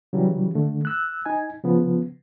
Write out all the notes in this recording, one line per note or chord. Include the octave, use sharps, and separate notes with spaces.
C#3 E3 F#3 G3
D3 A3
E6 F#6
D#4 G#5
C#3 F3 B3